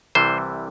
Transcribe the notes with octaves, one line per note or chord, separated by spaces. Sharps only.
C2 C3 E3 G3 C5